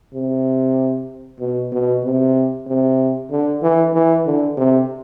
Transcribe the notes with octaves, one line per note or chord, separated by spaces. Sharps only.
C3
B2
B2
C3
C3
D3
E3
E3
D3
C3